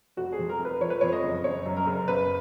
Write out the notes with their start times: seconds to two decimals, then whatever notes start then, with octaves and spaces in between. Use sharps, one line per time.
0.17 F1 F#4
0.32 G#4
0.39 F2
0.49 A#4
0.60 F1
0.65 B4
0.81 F3 C#5
0.90 B4
1.01 F2 C#5
1.13 D#5
1.23 F#1
1.44 F#1 C#5
1.66 F#2
1.76 A#4
1.86 F#1
2.08 F#1 B4